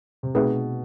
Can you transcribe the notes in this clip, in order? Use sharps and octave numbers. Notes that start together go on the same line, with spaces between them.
C3
B2 A3 C4 D#4 G#4 B4